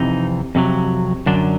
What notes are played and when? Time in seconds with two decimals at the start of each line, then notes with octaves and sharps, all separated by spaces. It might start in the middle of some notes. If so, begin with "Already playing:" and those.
Already playing: F2 C3 E3 D#4
0.55 F2 C3 D#3 F#3
1.26 F#2 D3 F#3 D4